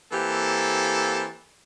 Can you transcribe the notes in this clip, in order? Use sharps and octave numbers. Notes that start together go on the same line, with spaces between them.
E3 A#3 C4 G4 A4